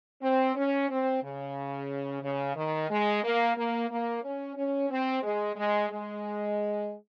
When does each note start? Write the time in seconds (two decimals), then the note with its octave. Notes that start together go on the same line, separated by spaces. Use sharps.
0.22 C4
0.56 C#4
0.89 C4
1.23 C#3
2.22 C#3
2.56 D#3
2.90 G#3
3.23 A#3
3.56 A#3
3.89 A#3
4.23 C#4
4.56 C#4
4.90 C4
5.23 G#3
5.56 G#3
5.90 G#3